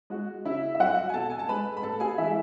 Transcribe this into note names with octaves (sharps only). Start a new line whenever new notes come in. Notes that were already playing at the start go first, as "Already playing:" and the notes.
G#3 F#4
C#3 E4 E5
E5
F#3 F#4 F#5
G#5
B2 A4 A5
G#5
A5
G#3 B4 B5
B5
A2 A4 A5
G#4 G#5
E3 G#3 E4 E5